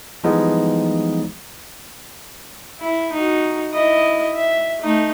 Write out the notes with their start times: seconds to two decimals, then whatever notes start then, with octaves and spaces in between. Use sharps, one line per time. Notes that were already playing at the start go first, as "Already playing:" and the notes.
0.24 E3 F3 G3 G#3 B3 D#4
2.80 E4
3.12 D#4 F#4
3.72 E4 D#5
4.34 E5
4.81 A3 D#4